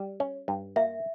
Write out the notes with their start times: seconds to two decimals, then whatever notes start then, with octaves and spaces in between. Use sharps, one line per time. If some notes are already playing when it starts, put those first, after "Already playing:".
Already playing: G3
0.20 C#4
0.48 G2
0.76 A#3 E5